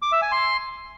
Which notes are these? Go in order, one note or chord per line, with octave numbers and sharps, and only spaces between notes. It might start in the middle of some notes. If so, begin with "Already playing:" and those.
D6
E5
G#5
C6